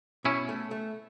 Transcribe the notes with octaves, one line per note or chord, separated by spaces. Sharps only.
B2 C#4 E4
A3
A3